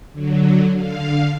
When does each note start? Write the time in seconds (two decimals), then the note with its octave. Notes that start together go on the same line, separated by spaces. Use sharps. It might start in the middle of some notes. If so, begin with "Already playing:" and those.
0.13 D3 F#3
0.76 D3 F5